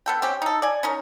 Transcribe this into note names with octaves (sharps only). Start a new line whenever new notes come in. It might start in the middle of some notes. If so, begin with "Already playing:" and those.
B3 A4 G5
C4 C#4 G4
D#4 A4
D5 G#5
C#4 D#4 A#4